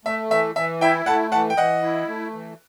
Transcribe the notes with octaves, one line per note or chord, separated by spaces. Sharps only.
A3 E5
E3 E5
E3 E5
E4 E5 G5
A3 F#5 A5
E3 F#5 A5
G5
E3 D#5 F#5
E4
A3
E3